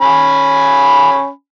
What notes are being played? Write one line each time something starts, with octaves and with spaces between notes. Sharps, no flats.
C#4 G#5 B5